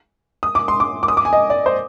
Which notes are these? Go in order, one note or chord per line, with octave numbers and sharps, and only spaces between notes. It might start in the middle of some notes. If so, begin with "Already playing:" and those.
D#6
D6
C6
D6
D6
D#6
D6
G#5
D#5
D5
C5